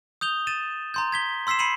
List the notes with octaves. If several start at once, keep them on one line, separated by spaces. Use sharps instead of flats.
D#6 G6 F7 G7
A6 D#7 E7
A#5 C6 G6
G#6 B6 G7
C6 E6 B6 C7 E7
B5 C7 C#7 D#7 E7 F#7